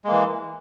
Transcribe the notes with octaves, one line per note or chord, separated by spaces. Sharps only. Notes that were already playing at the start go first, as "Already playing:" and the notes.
E3 G#3 A#3